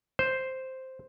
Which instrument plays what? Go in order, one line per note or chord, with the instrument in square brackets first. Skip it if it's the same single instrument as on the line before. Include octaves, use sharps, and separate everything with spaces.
[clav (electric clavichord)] C5